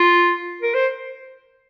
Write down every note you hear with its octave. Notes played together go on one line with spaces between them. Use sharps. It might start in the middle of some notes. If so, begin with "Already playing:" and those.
Already playing: F4
A#4
C5